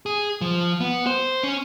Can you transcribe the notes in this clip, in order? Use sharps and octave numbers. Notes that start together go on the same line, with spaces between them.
G#4
F3
B3
C5
C#4